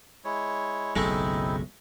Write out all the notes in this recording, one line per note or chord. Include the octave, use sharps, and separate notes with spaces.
G#3 E4 C#5
F#1 B1 C#3 G#3 A3 C4 D#4 E4